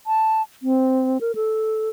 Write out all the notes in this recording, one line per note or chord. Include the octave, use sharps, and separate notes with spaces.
A5
C4
A#4
A4